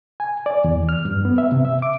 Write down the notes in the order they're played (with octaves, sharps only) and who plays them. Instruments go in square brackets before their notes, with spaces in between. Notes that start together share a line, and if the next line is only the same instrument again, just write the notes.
[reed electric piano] G#5
D5
E2
F6
G2
B3
E5
C3
E5
D6